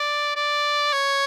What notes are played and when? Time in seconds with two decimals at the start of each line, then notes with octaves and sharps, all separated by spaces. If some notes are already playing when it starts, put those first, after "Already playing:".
Already playing: D5
0.36 D5
0.93 C#5